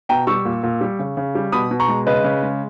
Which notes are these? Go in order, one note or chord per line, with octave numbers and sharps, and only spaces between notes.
B2 G5 A#5
G3 C#6 E6
A#2
A#2
G3
C#3
C#3
G3
B2 B5 D#6
B2
A#5 C#6
G#3
C#3 B4 D#5
C#3
G#3